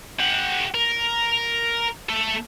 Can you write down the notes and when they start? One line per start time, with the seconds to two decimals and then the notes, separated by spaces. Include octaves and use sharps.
0.20 G4 F#5
0.75 A#4
2.09 A3 A4